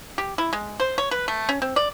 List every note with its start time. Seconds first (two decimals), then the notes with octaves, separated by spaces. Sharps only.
0.18 G4
0.38 E4
0.53 G#3
0.80 C5
0.98 C#5
1.11 B4
1.28 A3
1.49 C#4
1.62 C4
1.76 D5